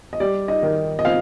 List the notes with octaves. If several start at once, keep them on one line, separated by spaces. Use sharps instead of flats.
D#5
G3 D5
D#4 D#5
D#3
D#5
C4 F4 F5